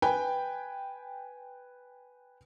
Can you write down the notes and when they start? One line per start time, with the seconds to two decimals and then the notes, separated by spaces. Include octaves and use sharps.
0.02 B4 G5 G#5